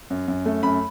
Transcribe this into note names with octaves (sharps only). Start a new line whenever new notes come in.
F#2
F#2
A3
F#2 B5